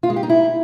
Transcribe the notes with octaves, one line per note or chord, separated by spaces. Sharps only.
F4
G#3
G4
D#4
E4